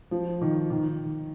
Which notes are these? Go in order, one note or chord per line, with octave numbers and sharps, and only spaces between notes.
F3
D#3
D#3